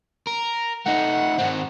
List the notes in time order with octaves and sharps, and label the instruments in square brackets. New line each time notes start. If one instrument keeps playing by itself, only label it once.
[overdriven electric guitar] A#4
[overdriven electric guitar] A3 D#4 [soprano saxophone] F#5
[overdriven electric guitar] G#2 C4